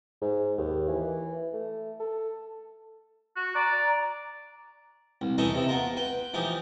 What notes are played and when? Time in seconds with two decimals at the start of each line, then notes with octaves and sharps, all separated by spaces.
0.22 G#2
0.58 D#2
0.88 E3
1.53 A3
2.00 A4
3.36 F#4
3.55 D5 A#5
5.21 C2
5.38 E3 C#4 D#4 E4 A4 D#5
5.55 C3 E4
5.68 B3 F4 A#4
5.97 B4 G5
6.34 E3 F3 D#4 G4